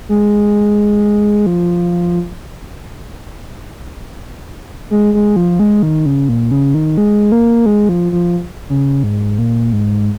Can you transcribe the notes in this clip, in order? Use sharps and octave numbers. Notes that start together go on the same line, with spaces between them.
G#3
F3
G#3
G#3
F3
G#3
D#3
C#3
A#2
C#3
D#3
G#3
A#3
G#3
F3
F3
C#3
G#2
A#2
G#2